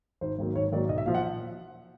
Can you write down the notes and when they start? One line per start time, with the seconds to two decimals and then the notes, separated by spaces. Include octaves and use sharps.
0.21 G#1 C5
0.38 G#2 D#3 F#3 A#3
0.55 G#1 C#5
0.72 G#2 D#3 F#3 A#3 D5
0.89 B1 D#5
0.98 E5
1.06 A#2 F3 F5
1.14 F#5